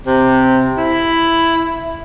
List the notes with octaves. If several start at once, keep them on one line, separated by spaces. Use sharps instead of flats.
C3
E4